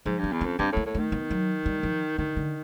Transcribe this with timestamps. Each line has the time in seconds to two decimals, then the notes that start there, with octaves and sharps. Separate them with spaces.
0.06 G#2 F3
0.19 G2 B3
0.32 E2
0.41 F2 C#4
0.58 G2 C4
0.72 A2 A#3
0.86 A2
0.95 D#3 A3
1.12 B3
1.30 F#3
1.66 G3
1.83 F3
2.18 D3 D#3
2.37 D3